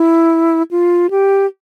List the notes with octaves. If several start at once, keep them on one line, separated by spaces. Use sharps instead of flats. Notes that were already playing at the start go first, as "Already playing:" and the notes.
Already playing: E4
F4
G4